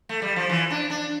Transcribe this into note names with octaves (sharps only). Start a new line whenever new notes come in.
A3
G3
F3
E3
D4
D4